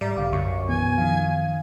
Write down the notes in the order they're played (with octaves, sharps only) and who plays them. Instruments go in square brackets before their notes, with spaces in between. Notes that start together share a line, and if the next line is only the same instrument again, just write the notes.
[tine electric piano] G#2 [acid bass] G3 [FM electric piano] D5 E5 A#5
[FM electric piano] B1 [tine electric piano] D3 F5 D6
[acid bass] F#2 [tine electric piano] C#6
[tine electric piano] B2 E3 B3 [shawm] G#5
[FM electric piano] D#3 F3 [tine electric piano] F5